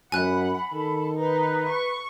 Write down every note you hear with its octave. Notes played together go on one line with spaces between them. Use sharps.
F#2 F#5 G#5 B5 F#6
D#3 A4
D#4 B4
C#6